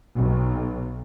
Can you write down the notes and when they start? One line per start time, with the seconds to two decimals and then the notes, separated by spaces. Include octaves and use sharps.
0.16 B1